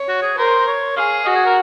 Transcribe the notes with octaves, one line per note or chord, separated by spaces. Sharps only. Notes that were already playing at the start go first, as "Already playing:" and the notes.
Already playing: C#5
F#4
G#4
A#4 C5
C#5
G#4 F5
F#4 D#5
G#4
A#4